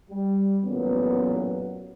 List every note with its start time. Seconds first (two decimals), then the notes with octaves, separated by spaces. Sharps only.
0.10 G3
0.64 A1 F#2 A#2 F#3 B3